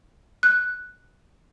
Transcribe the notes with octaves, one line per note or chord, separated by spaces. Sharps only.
F#6